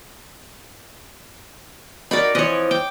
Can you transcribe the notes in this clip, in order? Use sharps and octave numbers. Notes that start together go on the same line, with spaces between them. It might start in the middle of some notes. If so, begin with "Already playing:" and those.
D#4 F#4 A#4 D5 B5
E3 F3 C4 C#5 D#5
G5 D6